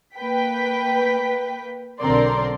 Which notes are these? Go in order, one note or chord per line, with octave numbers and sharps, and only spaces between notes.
A#3 B4 G5 B6
B1 D3 C4 A#4 D5 C6